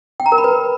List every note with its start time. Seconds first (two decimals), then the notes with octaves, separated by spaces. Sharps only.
0.20 G5
0.26 A#5
0.32 A#4
0.38 B5
0.44 B4